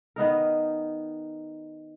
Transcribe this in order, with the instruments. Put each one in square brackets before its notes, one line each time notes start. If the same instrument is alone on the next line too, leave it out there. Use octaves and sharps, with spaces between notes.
[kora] D#3 B3 D#4 A#4